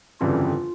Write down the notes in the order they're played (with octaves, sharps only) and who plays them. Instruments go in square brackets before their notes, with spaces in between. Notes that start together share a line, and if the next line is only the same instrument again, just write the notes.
[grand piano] G1 F2 C#3 E3 G3 [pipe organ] F4